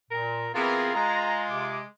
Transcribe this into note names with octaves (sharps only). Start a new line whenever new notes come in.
A#2 A#4
E3 B3 C4 F4 G#4 A#4
G#3 A#5
C3 D6